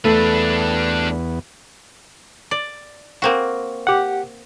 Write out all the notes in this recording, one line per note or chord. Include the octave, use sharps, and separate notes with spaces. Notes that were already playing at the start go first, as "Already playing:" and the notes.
E2 A3 B3 D4 B4
D5
A#3 C4 F#4
G4 F#5